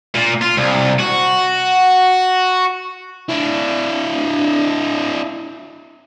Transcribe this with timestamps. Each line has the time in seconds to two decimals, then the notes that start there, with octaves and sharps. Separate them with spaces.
0.14 A#2
0.41 F4
0.57 C2
0.99 F#4
3.29 D4 E4